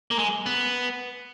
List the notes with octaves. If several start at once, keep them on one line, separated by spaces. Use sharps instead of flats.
A#3
G#3
B3